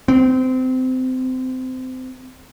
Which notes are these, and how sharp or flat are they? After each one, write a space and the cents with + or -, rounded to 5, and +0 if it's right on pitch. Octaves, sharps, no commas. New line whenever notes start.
C4 -25